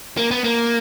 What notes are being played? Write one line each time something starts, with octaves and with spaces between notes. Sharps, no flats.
A#3
B3
A#3